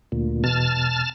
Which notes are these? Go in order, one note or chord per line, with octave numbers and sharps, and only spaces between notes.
D2 A#2
E2 B2 A5 F6 A6